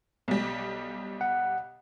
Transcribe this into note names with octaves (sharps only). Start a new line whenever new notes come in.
B1 G3
F#5